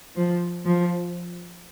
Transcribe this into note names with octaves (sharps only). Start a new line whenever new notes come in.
F3
F3